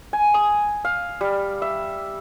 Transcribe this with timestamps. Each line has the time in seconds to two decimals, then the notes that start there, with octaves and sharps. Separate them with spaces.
0.13 G#5
0.34 D#6
0.85 F5
1.21 G3
1.62 E5